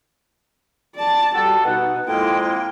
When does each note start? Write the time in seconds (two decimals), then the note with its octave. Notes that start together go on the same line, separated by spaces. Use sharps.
0.96 D5 A5
1.35 G3 F#4 G4 A4
1.64 B2 D#4 F#5
2.08 F2 G#3 A#3 E4 G5